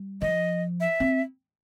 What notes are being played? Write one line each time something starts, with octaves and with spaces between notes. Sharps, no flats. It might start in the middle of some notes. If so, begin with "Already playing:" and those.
Already playing: G3
F3 D#5
E5
C4